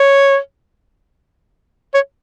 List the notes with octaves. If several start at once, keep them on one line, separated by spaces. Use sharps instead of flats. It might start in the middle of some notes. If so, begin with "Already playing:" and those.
Already playing: C#5
C#5